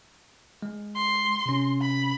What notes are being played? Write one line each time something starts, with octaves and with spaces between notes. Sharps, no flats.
G#3
C6
C3 C#4
B5